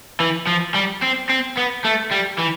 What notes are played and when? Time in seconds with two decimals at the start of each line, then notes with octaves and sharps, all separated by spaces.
0.20 E3
0.47 F3
0.74 G3
1.02 C4
1.29 C4
1.57 B3
1.85 A3
2.12 G3
2.39 E3